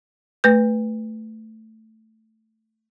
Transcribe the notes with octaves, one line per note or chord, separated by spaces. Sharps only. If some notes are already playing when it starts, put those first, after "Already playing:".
A3 B4 G6